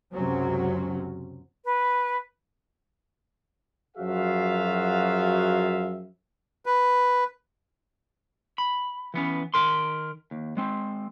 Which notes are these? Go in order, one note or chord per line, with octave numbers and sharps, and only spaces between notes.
C#2 F#2 C3 F#3 C4 C#4
B4
F#2 F3 F#4 G#4 E5 F5
B4
B5
E3 B3 C#4
D#3 A#4 C6
D#2
G#3 C4